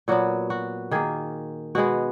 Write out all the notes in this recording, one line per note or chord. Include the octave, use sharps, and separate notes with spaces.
A#2 F#3 B3 F#4
F#4
D#3 A#3 G#4
B2 G#3 B3 F#4